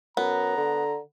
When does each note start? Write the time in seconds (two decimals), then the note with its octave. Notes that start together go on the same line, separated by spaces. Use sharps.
0.17 F#2 B3 A#5
0.57 D3